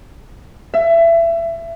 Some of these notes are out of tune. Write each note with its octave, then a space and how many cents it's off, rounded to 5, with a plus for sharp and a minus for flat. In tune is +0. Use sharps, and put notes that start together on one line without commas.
E5 +25